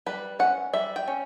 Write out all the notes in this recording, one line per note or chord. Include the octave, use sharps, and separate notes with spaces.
G3 B4
C#4 F#5
G3 E5
G5
C#4